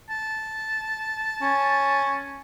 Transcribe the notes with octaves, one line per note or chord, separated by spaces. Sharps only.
A5
C#4